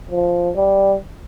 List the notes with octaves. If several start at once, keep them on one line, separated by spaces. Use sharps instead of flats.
F3
G3